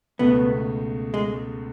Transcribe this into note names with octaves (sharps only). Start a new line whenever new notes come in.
C#2 B2 A3 B3
G#3